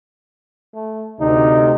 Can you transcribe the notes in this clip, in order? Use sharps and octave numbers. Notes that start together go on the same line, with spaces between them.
A3
D2 C3 D#4